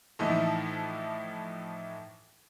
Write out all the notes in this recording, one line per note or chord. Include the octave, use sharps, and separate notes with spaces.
A2 E3 F3 D#4 E4